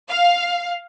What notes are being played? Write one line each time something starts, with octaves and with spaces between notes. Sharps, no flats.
F5